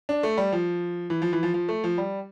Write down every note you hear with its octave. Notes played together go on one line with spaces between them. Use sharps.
D4
A3
G3
F3
E3
F3
E3
F3
F3
A3
F3
G3